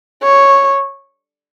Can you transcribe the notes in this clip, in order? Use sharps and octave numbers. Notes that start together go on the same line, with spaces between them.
C#5